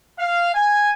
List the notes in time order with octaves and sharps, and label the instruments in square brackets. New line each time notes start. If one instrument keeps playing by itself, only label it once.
[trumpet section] F5
G#5